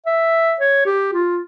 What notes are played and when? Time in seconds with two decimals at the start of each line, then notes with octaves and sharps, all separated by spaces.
0.06 E5
0.60 C#5
0.86 G4
1.13 F4